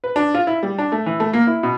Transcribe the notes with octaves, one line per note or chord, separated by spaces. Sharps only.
B4
D4
F4
E4
G3
D4
A3
E3
A3
A#3
E4
B2